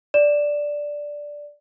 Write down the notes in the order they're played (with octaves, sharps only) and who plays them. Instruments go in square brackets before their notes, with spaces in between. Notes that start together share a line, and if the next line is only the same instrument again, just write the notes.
[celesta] D5 E7